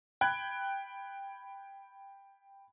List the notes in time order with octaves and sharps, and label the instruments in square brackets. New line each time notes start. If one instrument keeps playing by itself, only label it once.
[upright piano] G5 B5 F#6 G#6